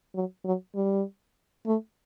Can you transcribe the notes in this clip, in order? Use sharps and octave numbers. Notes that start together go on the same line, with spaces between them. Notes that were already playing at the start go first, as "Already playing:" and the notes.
F#3
F#3
G3
A3